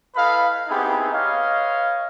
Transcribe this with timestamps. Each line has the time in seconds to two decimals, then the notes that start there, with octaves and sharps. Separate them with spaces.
0.15 E4 A4 B4 D#5 F5 B5
0.68 B3 C4 D#4 E4 G4 G#4
1.13 B4 C#5 D#5 F5